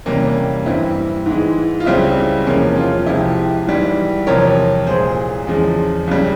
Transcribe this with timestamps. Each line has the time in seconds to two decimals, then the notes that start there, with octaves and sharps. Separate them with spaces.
0.06 E2 C3 G3 A#3 C#4
0.66 G2 E3 G3 C4 E4
1.26 G#2 E3 G#3
1.80 F4
1.86 C#2 C#3 G3 C4 E4
2.46 E2 C3 F3 G#3 A#3 C#4
2.76 C#4 F4
3.06 C2 C3 F3 G#3 E4 G4
3.67 G#2 E3 G3
4.27 E2 C3 F3 A#4 C#5
4.87 C2 A#2 G#3 G#4 C5
5.47 E2 C#3 F3 G#3
6.07 C#2 C#3 G3